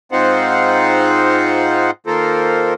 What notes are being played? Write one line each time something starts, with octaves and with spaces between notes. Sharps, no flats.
G#2 C4 D#4 F4 C5 F#5
D#3 A#3 F4 A4 A#4 C5